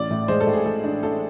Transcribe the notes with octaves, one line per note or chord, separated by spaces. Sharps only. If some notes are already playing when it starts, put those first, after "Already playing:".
Already playing: A1 D5
A2
G#3 C5
A4
A2
G#4
G#3 A4
D4
A1 A4